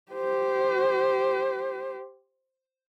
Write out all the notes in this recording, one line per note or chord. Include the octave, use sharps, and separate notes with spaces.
G4 C5